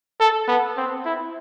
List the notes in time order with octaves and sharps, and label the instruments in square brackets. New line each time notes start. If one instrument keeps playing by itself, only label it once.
[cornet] A4
B3
C4
E4